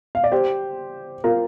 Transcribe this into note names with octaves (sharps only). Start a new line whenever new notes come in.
F5
D5
G4 C5
F4 A#4